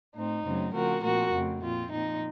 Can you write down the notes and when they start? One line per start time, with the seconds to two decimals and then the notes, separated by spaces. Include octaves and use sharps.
0.15 A2 A3 C4 D#4
0.45 F#2 C#3 F#3 A3 C4
0.74 C#3 F3 A3 C4 F#4 A#4
1.03 A#2 F3 C4 F#4 A#4
1.32 F2 C#3 A3 C4
1.62 A#2 F3 C4 F4
1.91 A#2 F3 C4 D#4